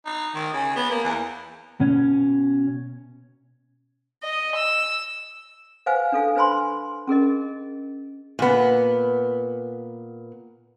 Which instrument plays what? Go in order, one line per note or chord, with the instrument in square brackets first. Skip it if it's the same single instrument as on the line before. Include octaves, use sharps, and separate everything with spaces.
[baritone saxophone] D#4
D#3
C#3
B3
A#3
E2
[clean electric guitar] B2 C#4
[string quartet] D#5
E6
[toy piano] B4 C5 F5 F#5 G#5
D4 A4 F5 G#5
D4 B4 C5 G#5 B5 C6
C#4 G#4 A#4 D#5
[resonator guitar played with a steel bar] A#2 B3